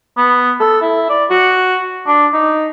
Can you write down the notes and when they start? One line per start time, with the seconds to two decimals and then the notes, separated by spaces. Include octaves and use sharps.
0.17 B3
0.60 A4
0.82 E4
1.09 D5
1.30 F#4
2.07 D4
2.33 D#4